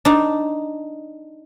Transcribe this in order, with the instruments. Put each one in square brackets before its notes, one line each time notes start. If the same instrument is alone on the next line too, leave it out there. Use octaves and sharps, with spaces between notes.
[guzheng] D4 D#4